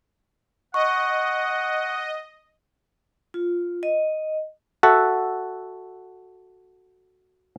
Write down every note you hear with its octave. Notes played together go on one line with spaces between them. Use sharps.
D#5 F#5 C#6
F4
D#5
F#4 A4 E5 F#5